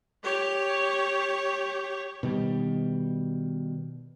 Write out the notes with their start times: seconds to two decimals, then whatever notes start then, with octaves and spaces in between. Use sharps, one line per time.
0.24 G4 C#5
2.23 B2 D#3 G3